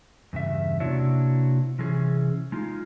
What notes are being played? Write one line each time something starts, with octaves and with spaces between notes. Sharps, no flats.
E2 G2 C#3 E5
C3 A#3 D4 E4 F#4 C#5
C3 E3 C#4 G#4
G#3 D#4 F4